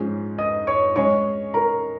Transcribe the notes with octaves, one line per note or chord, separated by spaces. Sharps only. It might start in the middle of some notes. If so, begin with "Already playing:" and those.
Already playing: G#2 F3 G#3 C#4 G#4
D#5 D#6
C#5 C#6
G#3 C#4 G#4 C#5 D#5 C#6
A#4 A#5